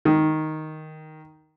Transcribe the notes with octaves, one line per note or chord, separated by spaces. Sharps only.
D#3